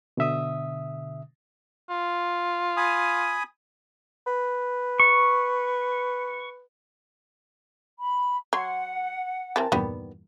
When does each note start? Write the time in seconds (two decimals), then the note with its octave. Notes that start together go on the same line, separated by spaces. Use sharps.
0.17 B2 D3 E5 D#6
1.90 F4
2.77 G#5 B5 D#6
4.27 B4
5.00 C#6
7.99 B5
8.53 F#3 F#5 C6 G#6
9.56 E3 C4 G4 A#4 A5
9.72 E2 G2 A#2 D#3 G3 B3